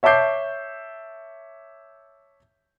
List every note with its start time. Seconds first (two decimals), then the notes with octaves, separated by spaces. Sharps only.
0.03 C#5 E5 A5 D6 G6 C7